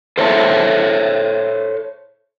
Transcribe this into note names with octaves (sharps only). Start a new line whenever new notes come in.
A4 C5 C#5 E5 G#5 A5